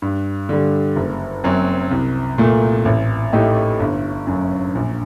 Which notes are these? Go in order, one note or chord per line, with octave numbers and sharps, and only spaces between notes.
G2
D3 G3
F#1
F#2 F#3 C4
C2
A#2 A3
A1
A2 A3 D#4 G4
G1
F#2 F#3
A#1